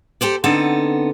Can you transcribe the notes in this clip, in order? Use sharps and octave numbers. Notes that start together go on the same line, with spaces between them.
G4 A4 C5 D5
D3 B3 C4 D#4 A4